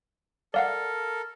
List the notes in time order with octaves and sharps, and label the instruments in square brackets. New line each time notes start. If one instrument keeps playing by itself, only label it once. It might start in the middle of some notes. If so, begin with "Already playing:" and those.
[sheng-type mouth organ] A4 A#4 [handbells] D5 F5 F#5